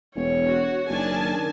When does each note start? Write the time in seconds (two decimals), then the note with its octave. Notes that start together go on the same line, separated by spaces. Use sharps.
0.15 E1 C#5
0.46 F#4
0.89 F#1 D#3 D4 G#5 A5